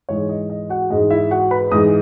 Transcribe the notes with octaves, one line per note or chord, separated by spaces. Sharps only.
G#2 E3 G#3 C#5
D#5
D#5
F#4 F#5
G#2 E3 G#3 D#5
E4 E5
F#4 F#5
B4 B5
G#2 E3 G#3 D#5 D#6